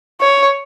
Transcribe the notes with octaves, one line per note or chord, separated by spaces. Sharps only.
C#5